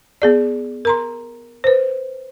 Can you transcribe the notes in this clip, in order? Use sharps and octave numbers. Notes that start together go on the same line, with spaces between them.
B3 G#4 D5
A#4 A#5 C6
B4 C5